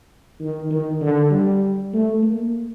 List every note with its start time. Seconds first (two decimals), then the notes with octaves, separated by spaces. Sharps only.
0.40 D#3
0.71 D#3
1.01 D3
1.31 G3
1.94 A3
2.23 A#3